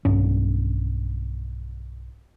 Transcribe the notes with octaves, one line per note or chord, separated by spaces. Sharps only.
B1 G2 C#4